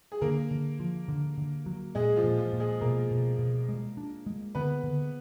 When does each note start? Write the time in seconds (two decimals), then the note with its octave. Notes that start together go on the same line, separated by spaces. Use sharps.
0.12 G#4
0.21 D3 A#3 A#4
0.51 D3
0.80 F3
1.08 D3
1.38 D3
1.66 F#3
1.95 A#2 G#3 G#4
2.16 F3 F4
2.24 A#2
2.38 F3 F4
2.53 A#2
2.60 G#3 G#4
2.81 B2 A#3 A#4
3.11 B2
3.39 B2
3.69 G#3
3.97 D4
4.26 G#3
4.55 D3 B3 B4
4.84 D3